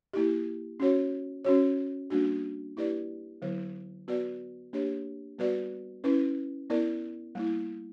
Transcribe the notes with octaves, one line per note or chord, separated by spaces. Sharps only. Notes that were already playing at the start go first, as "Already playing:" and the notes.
A#3 E4 G4
C#4 F#4 C#5
C#4 F#4 C#5
G3 A#3 D4 F#4
A#3 E4 G4 B4 D5
D3 F#3 B3 E4 B4
B3 F#4 B4 D5
A#3 D4 G4 C#5
G3 B3 F#4 B4 D5
C#4 E4 B4
B3 E4 A#4 D5
G3 A#3 E4